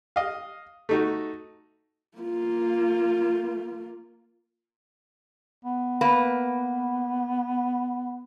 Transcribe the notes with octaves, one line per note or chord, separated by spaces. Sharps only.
D#5 F5
A3 D#4 F#4
A#3 F4
B3
A#3 B4